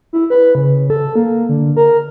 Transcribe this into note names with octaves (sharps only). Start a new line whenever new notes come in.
E4
B4
C#3
A4
A#3
D3
A#4